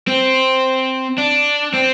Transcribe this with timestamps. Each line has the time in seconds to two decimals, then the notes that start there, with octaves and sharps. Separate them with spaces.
0.07 C4
1.18 D4
1.74 C4